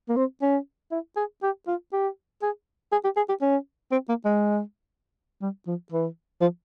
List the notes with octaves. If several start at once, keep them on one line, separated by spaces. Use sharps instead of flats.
A#3
C4
C#4
E4
G#4
G4
F4
G4
G#4
G#4
G4
G#4
G4
C#4
C4
A#3
G#3
G3
F3
E3
F3